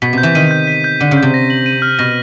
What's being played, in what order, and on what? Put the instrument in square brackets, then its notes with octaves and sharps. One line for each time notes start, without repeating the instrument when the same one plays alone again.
[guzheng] B2 [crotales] B6
[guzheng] C3 [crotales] G6
[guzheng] E3
[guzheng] D#3 [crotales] D#7
[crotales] G6
B6
G6
[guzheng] D3 [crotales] D#7
[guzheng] C#3
[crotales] G6
[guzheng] C3
[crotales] A#6
F#7
D#7
F6
[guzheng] B2 [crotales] A#6